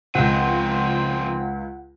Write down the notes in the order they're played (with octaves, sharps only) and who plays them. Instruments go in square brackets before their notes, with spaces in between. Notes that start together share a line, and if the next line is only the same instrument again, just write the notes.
[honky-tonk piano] C#2 [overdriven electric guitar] D#3 F3 [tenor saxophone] C4 [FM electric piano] F#5